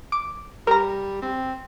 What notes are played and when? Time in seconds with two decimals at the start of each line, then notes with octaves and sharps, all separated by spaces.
0.12 D6
0.67 G3 A#4 A#5
1.22 C4